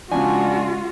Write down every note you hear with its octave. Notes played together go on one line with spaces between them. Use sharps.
C#3 F3 G#3 D4 F4 F#4 G#5